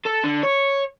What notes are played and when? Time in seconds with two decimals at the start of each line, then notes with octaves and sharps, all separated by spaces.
0.05 A4
0.24 D3
0.43 C#5